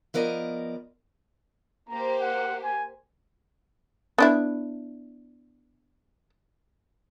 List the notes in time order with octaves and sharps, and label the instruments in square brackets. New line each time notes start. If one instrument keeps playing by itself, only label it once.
[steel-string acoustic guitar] F3 B3 A#4 D5 D#5
[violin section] A#3 G4 C5 [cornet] A#5
[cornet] F#5
G#5
[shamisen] B3 D4 E4